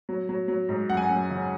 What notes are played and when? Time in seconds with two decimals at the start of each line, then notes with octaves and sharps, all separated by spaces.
0.09 F#3
0.29 F#3
0.48 F#3
0.69 G#2
0.89 F#2 F#5
0.97 G#5
1.05 F#2 F#5
1.30 C#3